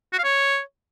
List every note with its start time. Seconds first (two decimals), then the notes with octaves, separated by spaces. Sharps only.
0.13 F#4
0.18 F5
0.24 C#5